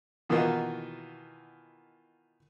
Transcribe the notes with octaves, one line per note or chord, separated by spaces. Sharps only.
B2 D#3 E3 A#3 F4 F#4